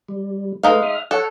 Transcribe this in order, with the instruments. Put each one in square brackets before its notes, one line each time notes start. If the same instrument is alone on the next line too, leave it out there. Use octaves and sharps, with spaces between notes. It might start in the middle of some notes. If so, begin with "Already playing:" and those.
[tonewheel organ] G3
[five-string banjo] G#3 D#4 F5 [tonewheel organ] A3 B4
[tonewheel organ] E5 D#6 F6
[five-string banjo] A4 [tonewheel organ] C#5 F#5